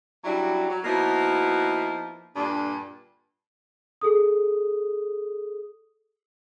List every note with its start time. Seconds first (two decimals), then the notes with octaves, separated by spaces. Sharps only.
0.24 F#3 G3 C#4 D4 E4 F#4
0.70 F#3
0.84 F3 A#3 B3 D#4 E4 F#4
2.35 G2 A#2 D3 D4
4.01 G#4 A4 D#6